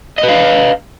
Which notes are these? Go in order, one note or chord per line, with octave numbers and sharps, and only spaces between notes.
B4 D#5 F5